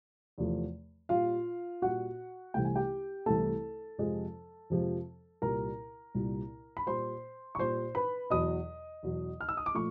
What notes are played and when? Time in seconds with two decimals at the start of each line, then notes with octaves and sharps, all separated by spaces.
0.38 E2 C3 F3 A3
1.09 A#2 G3 F4 F5
1.82 A#2 G3 F#4 F#5
2.54 C2 C3 E3 A3 G5
2.65 G#5
2.76 G4 G5
3.26 C2 C3 E3 A3 A4 A5
3.98 F2 C3 F3 G#3
4.70 F2 C3 F3 G#3
5.42 C2 A#2 G3 A#4 A#5
6.15 C2 A#2 G3
6.77 B5
6.86 A#2 G3 C5 C6
7.55 C#6
7.58 A#2 G3 C5 C6
7.95 B4 B5
8.30 E2 B2 F#3 D#5 D#6
9.03 E2 B2 F#3
9.41 F6
9.49 E6
9.57 D#6
9.66 D6
9.75 A#2 F3 A3 C#6